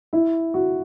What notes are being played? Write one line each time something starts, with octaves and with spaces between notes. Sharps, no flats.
E4
F#4